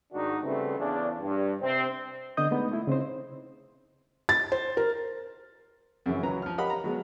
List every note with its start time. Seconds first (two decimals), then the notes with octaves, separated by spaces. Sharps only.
0.13 G#2 D#3 D4 D#4 F#4
0.43 C#3 E3 G3 A3 B3 C4
0.78 E2 C#3 D4
1.20 G2
1.61 C3 C4
2.37 D3 B3 D4 D#5 D#6 G6
2.51 G#3 A3 B3 D4 D#4
2.71 A3 E4
2.87 C#3 C4 D#4 C5
4.29 A6
4.52 C5
4.77 A#4
6.06 F#2 C#3 E3
6.22 C#2 F#3 B4 A#5
6.42 F3 F6
6.58 G4 A#4 D#5 F5 F#5 B5
6.70 A#5
6.84 F#3 G#3 B3